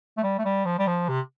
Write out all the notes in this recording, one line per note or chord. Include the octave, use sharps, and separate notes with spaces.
A3
G3
A3
G3
F3
G3
F3
C3